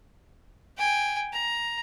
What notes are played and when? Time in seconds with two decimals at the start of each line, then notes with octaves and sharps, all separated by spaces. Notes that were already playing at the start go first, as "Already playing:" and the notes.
0.78 G5 G#5
1.33 A#5